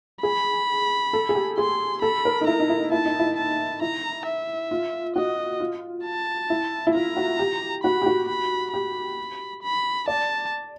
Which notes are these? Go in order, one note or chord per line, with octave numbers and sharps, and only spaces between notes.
G#4 B5
A4
G#4
G4
G#4 C6
A4 B5
A#4
D#4
E4 A#5
D#4
E4
E4 A5
D#4
E4
A5
E4 A#5
E5
F4
F#4 D#5
F4
A5
E4
E4
F4 A#5
F#4
G4
F#4 B5
G4
F#4
B5
G4 B5
B5
D5 A5